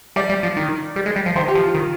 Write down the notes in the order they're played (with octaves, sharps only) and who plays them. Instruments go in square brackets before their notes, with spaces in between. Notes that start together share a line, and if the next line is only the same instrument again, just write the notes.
[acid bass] G3 [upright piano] D5
[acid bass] G3
F3
D#3
G3
G#3
G3
F3
[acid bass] D#3 [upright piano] C5
[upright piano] G4
[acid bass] F3
[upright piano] F4
[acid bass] D#3